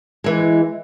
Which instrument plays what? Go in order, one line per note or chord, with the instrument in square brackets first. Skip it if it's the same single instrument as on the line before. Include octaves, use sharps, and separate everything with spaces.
[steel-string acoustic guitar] E3 G#3